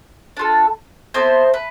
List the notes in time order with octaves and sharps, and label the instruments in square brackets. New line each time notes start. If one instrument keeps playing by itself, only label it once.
[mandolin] D4 F4 A4
B3 C4 E4 A4 C5
B4